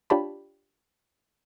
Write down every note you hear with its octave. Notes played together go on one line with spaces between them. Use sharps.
D4 F4 G4 C#5 A5 B5